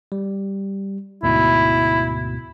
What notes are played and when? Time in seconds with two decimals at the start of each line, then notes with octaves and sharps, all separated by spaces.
0.12 G3
1.23 D2 G#2 B2 E4